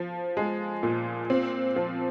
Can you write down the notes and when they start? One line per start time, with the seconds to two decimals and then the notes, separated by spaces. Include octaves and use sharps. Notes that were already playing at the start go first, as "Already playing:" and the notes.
Already playing: F3
0.37 G#3
0.83 A#2
1.30 C4
1.76 F3